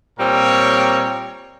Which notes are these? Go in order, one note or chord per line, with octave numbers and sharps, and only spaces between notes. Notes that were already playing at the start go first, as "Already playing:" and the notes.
A#2 G3 C4 A#4 C#5